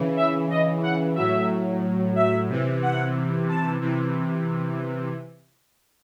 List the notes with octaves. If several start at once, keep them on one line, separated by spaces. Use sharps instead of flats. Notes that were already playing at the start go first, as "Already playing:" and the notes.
Already playing: C#3 E3
E5
D#5
F#5
A2 F#3 E5
E5
C3 E3
F#5
A5
C3 E3